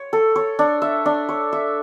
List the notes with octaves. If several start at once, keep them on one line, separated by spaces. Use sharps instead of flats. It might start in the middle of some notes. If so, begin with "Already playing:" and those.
Already playing: C#5
A4
C#5
D4
E5
D4
C#5
E5